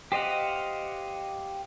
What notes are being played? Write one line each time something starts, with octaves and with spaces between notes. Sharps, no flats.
G4 C5 D#5 F5 F#5